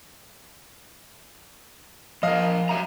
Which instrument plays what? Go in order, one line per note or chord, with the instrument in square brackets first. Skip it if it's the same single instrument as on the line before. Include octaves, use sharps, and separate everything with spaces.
[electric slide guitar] F3 A#4 [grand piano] D#5 F5
[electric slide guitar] F#3 E5 A#5